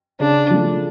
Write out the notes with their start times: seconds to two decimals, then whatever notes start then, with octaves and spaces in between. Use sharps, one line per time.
0.20 C#3 D4
0.50 F3 A3